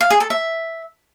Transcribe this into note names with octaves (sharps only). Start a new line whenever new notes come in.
F5
G#4
A4
E5